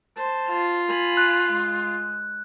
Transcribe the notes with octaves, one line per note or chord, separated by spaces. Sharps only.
C5 A5
F4
G#5 B5
F#6
G#3